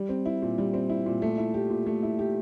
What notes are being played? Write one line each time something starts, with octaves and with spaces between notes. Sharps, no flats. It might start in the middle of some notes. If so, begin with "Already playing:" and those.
Already playing: G3
C4
E4
A#2
G3
C4
E4
A#2
A3
E4
G4
A#2
A3
E4
G4